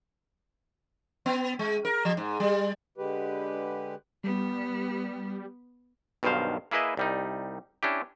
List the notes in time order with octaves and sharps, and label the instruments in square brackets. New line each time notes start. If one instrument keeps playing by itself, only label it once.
[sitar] B3
G#3
A#4
F3
G#2
G3
[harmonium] D3 G#3 G4 B4
[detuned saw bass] G3 [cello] B3
[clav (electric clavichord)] B1 G2 B2 D#3 C5 F5
A#3 E4 G#4 B4 D#5 E5
C2 G3 D#4
C#4 D4 E4 G4